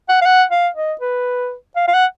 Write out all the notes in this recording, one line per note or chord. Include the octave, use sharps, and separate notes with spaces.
F#5
F5
F#5
F5
D#5
B4
F5
F5
F#5